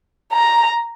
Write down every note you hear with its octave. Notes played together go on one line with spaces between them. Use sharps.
A#5